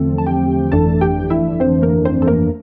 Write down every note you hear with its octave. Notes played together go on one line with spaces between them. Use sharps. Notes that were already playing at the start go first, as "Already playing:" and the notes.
Already playing: E2 D3 F3 A3 C4 A4
A5
G4 G5
G1 F2 E3 A3 D4 A4 A5
G4 G5
E4 E5
C4 C5
A#3 A#4
C4 C5
A4
A#3 A#4